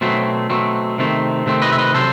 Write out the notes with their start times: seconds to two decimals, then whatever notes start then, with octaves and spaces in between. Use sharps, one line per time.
0.01 B2 F#3 A3 C4
0.49 B2 F#3 A3 C4
0.98 C3 D#3 A3 C4
1.46 C3 D#3 A3 C4
1.62 B4 D#5
1.72 E5
1.78 B4 D#5
1.94 C3 F#3 A4 C5